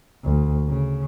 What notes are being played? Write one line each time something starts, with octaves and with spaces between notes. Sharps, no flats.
D2
C#3